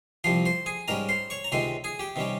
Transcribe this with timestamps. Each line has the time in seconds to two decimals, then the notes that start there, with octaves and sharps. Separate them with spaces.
0.24 C2 C3 F3 C5 C6
0.45 C5 C6
0.66 G#4 G#5
0.88 G#2 G3 C#4 A#4 A#5
1.09 C5 C6
1.30 C#5 C#6
1.44 A#5
1.52 C#2 C3 D#3 G#3 C5 C6
1.84 G#4 G#5
1.99 G4 G5
2.16 C3 D#3 G3 C#4